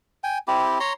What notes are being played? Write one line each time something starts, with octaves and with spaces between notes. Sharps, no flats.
G5 G#5
C4 E4 G4
C#5 A#5 C6